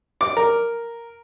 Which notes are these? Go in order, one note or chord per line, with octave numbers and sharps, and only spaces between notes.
D6
A#4